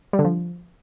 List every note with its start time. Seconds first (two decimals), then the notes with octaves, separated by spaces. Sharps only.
0.13 G3
0.19 D3
0.24 F3